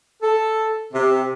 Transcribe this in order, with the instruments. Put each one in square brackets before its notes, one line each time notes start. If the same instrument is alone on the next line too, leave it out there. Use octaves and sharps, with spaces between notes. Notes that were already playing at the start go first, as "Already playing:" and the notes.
[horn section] A4
C3